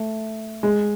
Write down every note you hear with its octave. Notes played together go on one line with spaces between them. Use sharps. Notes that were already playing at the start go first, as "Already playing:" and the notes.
Already playing: A3
G#3